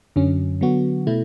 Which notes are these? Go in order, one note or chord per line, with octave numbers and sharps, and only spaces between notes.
F#2 D3 F#3 C#4
D3 F#3 B3 F#4
B2 A3 E4